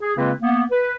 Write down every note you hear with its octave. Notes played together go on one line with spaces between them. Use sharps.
G#4
C#3 G#3 A#3 C4 F4 B4
A#3 B3
B4